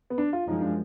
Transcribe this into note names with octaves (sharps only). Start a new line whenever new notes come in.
B3
D4
F4
F#2 F3 G#3 D#4
D4